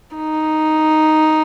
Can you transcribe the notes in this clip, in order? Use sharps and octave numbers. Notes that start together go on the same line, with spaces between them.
D#4